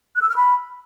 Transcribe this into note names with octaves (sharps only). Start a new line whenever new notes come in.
F#6
E6
F6
B5